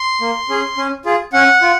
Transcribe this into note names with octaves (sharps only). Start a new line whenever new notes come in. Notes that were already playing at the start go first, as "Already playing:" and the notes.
Already playing: C6
A#3
C#4 G#4
C#4
F4 G#4
C#4 F#5
F4